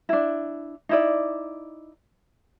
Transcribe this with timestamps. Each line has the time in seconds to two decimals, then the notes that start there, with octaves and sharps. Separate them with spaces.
0.09 D4 E4
0.89 D#4 E4 D5